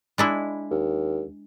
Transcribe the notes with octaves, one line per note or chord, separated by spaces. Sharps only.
G#3 D4 E4
D#2